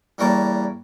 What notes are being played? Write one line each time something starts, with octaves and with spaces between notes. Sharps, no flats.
E2 G3 A#3 A#4 C#5 A5